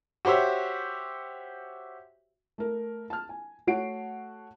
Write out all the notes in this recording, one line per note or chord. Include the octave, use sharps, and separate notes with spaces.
F#4 G4 C5 C#5 E5
A3 A#4
A5 F6
G#5
A3 F#4 C#5 F#5 C7 D7